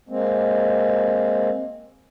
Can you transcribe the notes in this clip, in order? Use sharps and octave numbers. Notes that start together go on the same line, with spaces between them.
G#3 A#3 C4